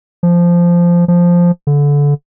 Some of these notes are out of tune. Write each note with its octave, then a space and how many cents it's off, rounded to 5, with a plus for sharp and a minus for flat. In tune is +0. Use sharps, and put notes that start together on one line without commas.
F3 -10
F3 +0
D3 -25